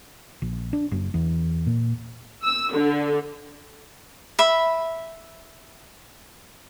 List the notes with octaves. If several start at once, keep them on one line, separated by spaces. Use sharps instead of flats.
A#1
D4
F#1
E2
A#2
E6
D3
E5 B5